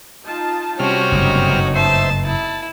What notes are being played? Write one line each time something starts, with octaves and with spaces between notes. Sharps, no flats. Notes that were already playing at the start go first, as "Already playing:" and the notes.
D#4 F4 A5
C3 G3 C#4 F#4 F6
F#1 G2 A3 B3 D#4
C5 E5 A5
E4 A5